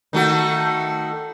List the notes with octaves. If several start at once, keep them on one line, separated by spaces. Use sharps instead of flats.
D#3 A3 F#4